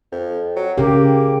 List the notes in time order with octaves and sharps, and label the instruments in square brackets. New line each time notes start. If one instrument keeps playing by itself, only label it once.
[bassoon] F2
F#3
[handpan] C#3 G4 [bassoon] A#3